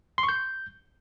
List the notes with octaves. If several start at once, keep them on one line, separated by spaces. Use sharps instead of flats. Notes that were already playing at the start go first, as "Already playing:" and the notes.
C6
C#6
G6